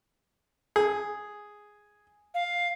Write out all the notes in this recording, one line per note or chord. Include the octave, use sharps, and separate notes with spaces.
G#4
F5